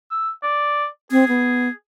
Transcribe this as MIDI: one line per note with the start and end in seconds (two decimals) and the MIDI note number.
0.11 0.30 88
0.43 0.87 74
1.11 1.28 60
1.11 1.71 68
1.28 1.69 59